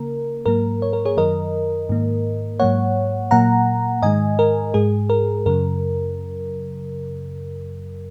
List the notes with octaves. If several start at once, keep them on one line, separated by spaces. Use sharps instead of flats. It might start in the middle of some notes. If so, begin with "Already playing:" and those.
Already playing: C#3 A#3 A#4
G#2 F#3 A#3 A#4
C#5
A#4
G#4 C#5
F#2 D#3 F#3 A#4 D#5
G#2 D#3 A#3
G#2 F#3 A#3 C#5 F#5
A#2 F#3 A#3 F#5 A#5
G#2 D#3 G#3 D#5 G#5
A#4
G#2 G#3 G#4
A#4
F#2 C#3 F#3 A#4